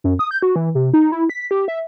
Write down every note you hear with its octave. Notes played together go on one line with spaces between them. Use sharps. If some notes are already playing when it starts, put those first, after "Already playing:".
F#2
D#6
G6
F#4
E3
C3
D#4
E4
B6
G4
E5